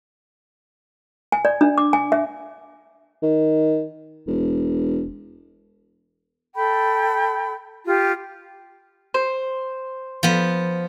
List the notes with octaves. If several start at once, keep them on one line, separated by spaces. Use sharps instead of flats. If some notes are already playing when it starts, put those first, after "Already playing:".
G#5
D5
D4
D6
G#5
E5
D#3
E1
A4 G5 B5
F4 G4
C5
F3 B3